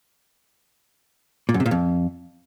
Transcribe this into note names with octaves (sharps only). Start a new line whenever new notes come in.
A#2
F#2
C3
A#2
F2